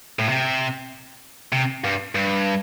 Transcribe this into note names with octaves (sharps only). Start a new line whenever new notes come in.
A2
C3
C3
G2
G2